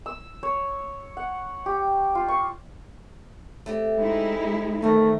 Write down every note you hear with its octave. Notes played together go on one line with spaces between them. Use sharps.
E6
C#5
F#5
G4
F4
C#6
A3 C4 G4
G#3 D#4 E4
D#3 A3 C4 A#4